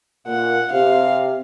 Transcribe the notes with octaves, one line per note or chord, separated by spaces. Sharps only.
A#2 F#5
C3 F5